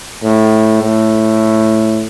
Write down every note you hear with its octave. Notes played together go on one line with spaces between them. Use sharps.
A2
A2